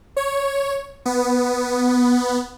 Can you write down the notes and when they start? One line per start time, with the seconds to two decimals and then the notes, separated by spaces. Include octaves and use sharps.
0.17 C#5
1.06 B3